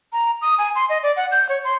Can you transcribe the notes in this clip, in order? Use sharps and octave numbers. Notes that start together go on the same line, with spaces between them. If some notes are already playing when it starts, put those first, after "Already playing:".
A#5
D#6
G#5
C6
D#5
D5
F#5
G6
C#5
C6